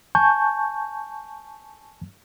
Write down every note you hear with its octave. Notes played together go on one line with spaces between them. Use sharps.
G#5 A5 C#6 G6